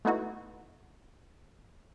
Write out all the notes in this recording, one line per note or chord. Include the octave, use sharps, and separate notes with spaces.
A3 B3 D#4 E4 F#4